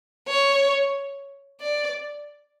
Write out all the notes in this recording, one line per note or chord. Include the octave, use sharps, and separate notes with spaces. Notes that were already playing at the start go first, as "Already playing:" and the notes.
C#5
D5